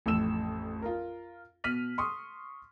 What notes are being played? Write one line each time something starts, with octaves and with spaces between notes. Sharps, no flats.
A1 F2 A2 E6 E7
F4 A#4
B2 F6 B6 D#7 F#7
C6 C#6 D#6